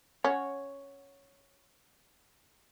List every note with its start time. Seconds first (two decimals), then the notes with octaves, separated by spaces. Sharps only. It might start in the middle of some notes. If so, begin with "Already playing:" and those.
0.24 C#4 C#5 F#5